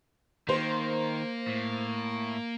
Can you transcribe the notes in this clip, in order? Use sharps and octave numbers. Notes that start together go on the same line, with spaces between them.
D#3 A#3 C5 C6
A2